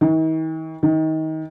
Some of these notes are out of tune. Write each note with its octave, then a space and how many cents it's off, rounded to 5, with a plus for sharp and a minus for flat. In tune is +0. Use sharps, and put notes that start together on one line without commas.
D#3 +45
D#3 +25